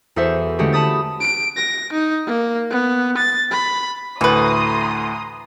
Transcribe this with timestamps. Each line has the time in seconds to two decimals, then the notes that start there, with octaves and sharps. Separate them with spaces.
0.16 E2 F#4 A4 C5 E5
0.59 D3 G#3 A3 C#4 F#4 G4
0.73 A5 B5 D#6 A6
1.20 D7
1.56 A#6
1.93 D#4
2.27 A#3
2.70 B3
3.17 A6
3.51 B5
4.21 D2 A2 E3 B4 A#5 C6 D#6